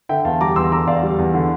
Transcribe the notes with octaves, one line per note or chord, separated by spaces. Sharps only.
D3 E5 G5
E2 F5 A5
G3 A#5 D6
E2 C6 E6
D3 A#5 D6
E2 D5 F5
G3
E2
D3